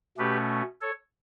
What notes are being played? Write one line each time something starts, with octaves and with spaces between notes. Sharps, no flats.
B2 A3 C#4 G4 B4
A4 C#5